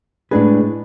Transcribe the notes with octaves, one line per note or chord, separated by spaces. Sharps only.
A2 G#3 D4 G#4 B4